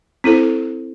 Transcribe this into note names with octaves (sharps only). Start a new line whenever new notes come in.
C4 E4 A4 C5